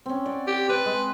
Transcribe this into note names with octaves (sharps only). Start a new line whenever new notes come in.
C4 C#4
D5 F#5
G4
C4 B4 D5
G#3